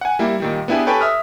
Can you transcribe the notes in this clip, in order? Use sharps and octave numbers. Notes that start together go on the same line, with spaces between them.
F#5 G#5
G3 A#3 E4
A#2 D#3 G3
B3 D4 E4 G4 G#4 B4
G4 A4 B4 C#5 G5 G#5
E5 D#6 F6